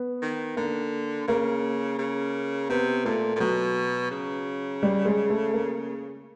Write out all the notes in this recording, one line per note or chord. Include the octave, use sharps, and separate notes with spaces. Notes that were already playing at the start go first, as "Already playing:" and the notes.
Already playing: B3
D#3
D3 A#3
C#3 A#3
C#3
C3 B3
A#2 A3
A#2
B2 F#3
C#3
G3
G#3
A3
A#3